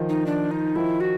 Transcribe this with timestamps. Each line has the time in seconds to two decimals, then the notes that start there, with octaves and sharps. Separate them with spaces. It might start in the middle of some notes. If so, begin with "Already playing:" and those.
Already playing: D#3 F3
0.09 D#4
0.26 D4
0.51 D#4
0.76 D#3 F3 E4
1.00 F#4